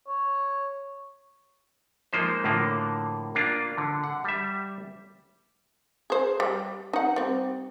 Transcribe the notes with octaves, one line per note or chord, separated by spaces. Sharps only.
C#5
F3 G#3 A#3 D#4 C5
A2 D3 F3 A#3
A#3 D4 F4
D3
F#5
G3 E5
G#4 C5
G3
D#4 F#5
G3 C4